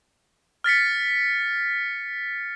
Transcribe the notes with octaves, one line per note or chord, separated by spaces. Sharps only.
F6 A6 B6 C#7